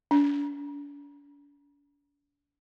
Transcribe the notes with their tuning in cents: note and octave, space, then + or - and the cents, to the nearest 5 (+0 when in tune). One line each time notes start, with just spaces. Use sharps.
D4 -45